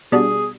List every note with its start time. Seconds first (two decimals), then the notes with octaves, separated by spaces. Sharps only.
0.12 B2 G3 D4 G#4